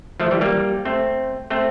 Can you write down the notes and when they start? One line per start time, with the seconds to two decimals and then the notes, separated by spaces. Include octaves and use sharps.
0.20 F3 A3
0.31 E3 G3
0.41 G3 A#3
0.85 A3 C4
1.50 A3 C4